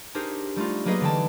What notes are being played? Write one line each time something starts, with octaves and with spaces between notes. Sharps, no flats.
D4 D#4 G4 G#4 A#4 C5
G3 A3 D#4 F4
F#3 A#3 D#4 G#4 B4 D#5
D3 E3 G5 A5